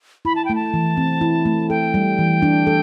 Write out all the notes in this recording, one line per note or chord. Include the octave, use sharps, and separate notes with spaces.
E4 B5
A5
A3 G5
A5
E3
C4
E4
A3
A4 G5
G3
E3
D4
A4